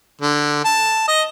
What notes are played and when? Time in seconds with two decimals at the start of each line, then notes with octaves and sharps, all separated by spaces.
0.22 D3
0.65 A5
1.08 D#5